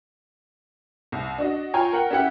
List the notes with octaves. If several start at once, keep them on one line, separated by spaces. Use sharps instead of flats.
C2
D4 F#4 D#5
F4 C#5 G5 G#5 A#5
A#4 F#5 G5
C#4 E4 G4 F#5